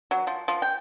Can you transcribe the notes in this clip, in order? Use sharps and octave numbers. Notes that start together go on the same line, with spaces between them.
F#3
F3
F3
G5